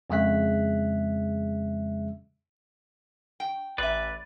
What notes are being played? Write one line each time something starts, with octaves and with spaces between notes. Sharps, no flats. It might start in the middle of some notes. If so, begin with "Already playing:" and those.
F2 C#3 G#3 E5 F#6 B6
G5
A1 B4 D5 E5